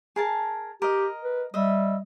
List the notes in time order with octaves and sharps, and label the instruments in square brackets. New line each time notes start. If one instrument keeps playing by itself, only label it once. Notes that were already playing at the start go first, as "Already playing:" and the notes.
[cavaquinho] G#4 A#4 A5
[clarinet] G4 [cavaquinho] A#4 D#5
[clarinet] B4
[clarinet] G3 [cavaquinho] D#5 E5